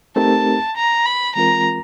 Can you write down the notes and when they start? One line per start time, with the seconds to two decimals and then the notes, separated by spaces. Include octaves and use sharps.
0.16 A3 C4 D#4 G4 A#4 A5
0.76 A#5
1.05 B5
1.35 E3 G#3 C4 F4 A#4 A#5